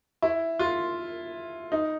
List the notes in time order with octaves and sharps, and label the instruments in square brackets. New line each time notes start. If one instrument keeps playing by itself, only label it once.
[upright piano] E4
F4
D#4